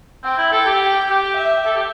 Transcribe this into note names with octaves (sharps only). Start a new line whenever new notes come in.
C4 G5
E4
A4 G5
G4
G5
G4
E5
A4
G4